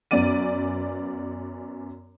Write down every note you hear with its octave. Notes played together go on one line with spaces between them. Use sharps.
F#2 B3 C#4 D5 D#7